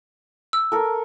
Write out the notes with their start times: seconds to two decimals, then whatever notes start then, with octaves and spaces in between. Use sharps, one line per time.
0.53 E6
0.72 A4 A#4